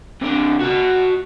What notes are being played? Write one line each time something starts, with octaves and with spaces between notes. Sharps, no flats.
C3 D4
F#4 A5